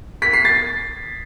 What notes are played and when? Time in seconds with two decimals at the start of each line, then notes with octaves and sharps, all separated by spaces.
0.22 B6
0.33 C7
0.45 A6